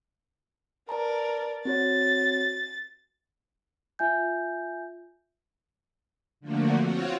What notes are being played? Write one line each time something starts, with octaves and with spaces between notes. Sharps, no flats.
A#4 B4 D5 A5 A#5
C4 F#4 C#5 A6
F4 E5 G#5 G6
D3 F3 A3 A#3 F#4
C4 F4 F#4 C#5